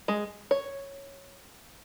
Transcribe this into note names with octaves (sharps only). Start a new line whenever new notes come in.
G#3
C#5